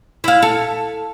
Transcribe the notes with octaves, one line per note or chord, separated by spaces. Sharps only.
E4 F5
A4